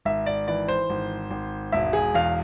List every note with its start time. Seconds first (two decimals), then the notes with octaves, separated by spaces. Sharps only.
0.05 G#1 E5
0.26 D5
0.48 E3 D5
0.68 C5
0.90 G#1
1.30 G#1
1.72 E1 E5
1.93 G#4
2.14 E2 F5